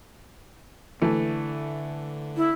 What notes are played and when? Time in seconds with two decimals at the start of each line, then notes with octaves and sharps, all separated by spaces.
1.02 D3 E3 A3
2.37 E4